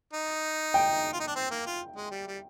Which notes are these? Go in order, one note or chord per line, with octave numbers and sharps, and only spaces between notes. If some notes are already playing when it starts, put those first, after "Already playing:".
D#4
G5
F4
D#4
D4
C4
A#3
F4
G#3
G3
G3